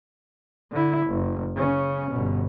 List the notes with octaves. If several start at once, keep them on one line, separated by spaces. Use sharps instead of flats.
D3 E4
F#1
C#3 C#4
G1 B2